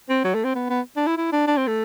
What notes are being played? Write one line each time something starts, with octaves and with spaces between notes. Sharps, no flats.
C4
F#3
A3
C4
B3
B3
D4
E4
E4
D4
D4
C4
A3